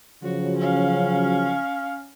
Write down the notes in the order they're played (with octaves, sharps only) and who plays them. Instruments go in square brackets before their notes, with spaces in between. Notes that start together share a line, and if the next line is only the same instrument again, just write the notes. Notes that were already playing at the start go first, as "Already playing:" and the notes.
[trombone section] C#3 F3 F#3 [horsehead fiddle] F#4
[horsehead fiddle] C#4 F5